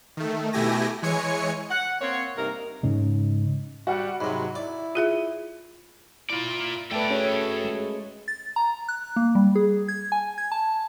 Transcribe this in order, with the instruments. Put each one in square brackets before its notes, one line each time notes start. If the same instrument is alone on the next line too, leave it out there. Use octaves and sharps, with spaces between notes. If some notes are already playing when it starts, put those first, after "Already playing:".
[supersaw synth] D#3 A3
B2 A3 E4 G4 G#5 A#6
E3 G#3 C#5 G#5 C#7
[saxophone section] F#5
A#3 C4 C#5
G2 C3 A#3 D#4 A#4
[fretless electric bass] G#2 C#3 G#3
[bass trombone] G3 [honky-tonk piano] F#4 F#5 F#6
[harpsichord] G#2 C3 [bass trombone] F#3 [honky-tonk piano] B5
[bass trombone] E4 [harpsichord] D5
[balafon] F4 G#4 E5
[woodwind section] E4 [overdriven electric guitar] F4 D5
[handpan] A3 B4 [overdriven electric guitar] A4 G5 [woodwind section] D5 E5 A5
[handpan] C#4 [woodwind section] F#4 G#4 C#5
[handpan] G#3
[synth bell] A6
A#5
F#6
A#3
G3
G#4
G#6
G#5
G#6
A5